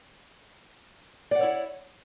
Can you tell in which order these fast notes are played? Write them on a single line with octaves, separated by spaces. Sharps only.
D5 F#5 C#5 E4